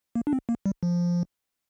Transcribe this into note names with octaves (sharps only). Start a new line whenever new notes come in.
A#3
D4
C4
A#3
G3
F3